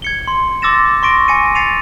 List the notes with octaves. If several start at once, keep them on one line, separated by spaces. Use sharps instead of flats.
G#6 C#7 G7
C6
C6 D6 E6 A6 A#6 E7
C6 C#6 A#6 D7
G#5 A#6 C#7 D#7
A6 C7 C#7 D#7 F7